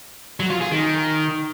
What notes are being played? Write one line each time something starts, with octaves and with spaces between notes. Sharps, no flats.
F#3
F4
G#4
D#3